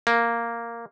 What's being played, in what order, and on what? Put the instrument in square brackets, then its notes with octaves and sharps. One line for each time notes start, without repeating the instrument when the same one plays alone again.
[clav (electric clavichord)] A#3